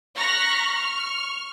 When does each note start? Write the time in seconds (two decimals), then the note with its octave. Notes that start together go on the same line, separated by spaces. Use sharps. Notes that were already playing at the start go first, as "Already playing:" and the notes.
0.18 A#5 C#6 F6 F#6 A#6 B6
0.74 C#6 F6